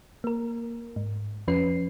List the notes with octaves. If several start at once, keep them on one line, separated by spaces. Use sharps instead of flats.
A#3 A#4
G#2
F2 F3 C#4 B4 C7